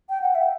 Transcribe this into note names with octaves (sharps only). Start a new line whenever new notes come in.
G5
F#5
E5